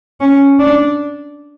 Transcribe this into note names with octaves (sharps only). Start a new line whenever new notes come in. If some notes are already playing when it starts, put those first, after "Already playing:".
C#4
D4